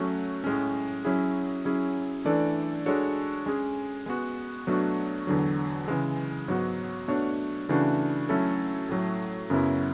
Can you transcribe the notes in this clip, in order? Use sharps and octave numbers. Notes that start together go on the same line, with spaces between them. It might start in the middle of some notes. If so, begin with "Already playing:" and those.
Already playing: F#3 A3 C#4 F#4
A2 G#3 C#4
F#3 C#4 E4 G#4
F#3 C#4 E4 G#4
E3 A3 D4 A4 D5
G#3 D4 F#4 A4 C#5
G#3 C#4 G#4
G#3 B3 F#4
B2 F#3 A3 D4 F#4
E2 D3 F#3
C#3 E3 G#3
G#2 F#3 B3 F#4
B2 A3 D4 F#4 C#5
C#3 E3 A3 D4 F#4
F#3 A3 C#4 E4 A4
A2 F#3 A3
F#2 C#3 F#3 B3 E4